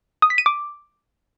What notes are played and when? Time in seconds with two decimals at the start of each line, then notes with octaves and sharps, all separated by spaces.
0.22 D#6
0.30 B6
0.38 D#7
0.46 D6